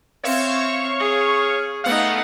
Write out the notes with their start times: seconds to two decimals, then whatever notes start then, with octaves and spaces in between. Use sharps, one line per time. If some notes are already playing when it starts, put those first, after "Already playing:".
0.24 C4 C#5 E5 F5 C#6
0.99 G#4
1.84 A3 B3 D#4 F5 F#5